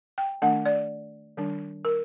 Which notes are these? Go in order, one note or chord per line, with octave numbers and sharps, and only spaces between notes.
G5
D#3 A3 D4 F#5
D5
D#3 G3 D4
A#4